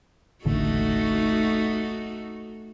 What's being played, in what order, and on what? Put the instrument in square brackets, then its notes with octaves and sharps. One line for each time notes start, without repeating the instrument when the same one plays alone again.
[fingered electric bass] E1 A1 D3 [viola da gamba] A3 D#4 F#4